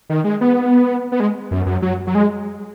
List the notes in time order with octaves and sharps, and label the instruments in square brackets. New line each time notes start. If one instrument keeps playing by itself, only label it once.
[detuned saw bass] D#3
G#3
B3
B3
G#3
F#2
F#2
F#3
F#3
G#3